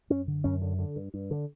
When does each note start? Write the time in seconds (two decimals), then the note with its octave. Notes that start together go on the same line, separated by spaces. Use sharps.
0.10 F#2 C#4
0.27 D3
0.44 F#2 C#4
0.62 D3
0.79 D3
0.96 G2
1.14 G2
1.31 D3